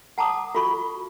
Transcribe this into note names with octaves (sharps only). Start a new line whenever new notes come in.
F#5 A5 A#5 D6 D#6
F4 F#4 A4 B5 C#6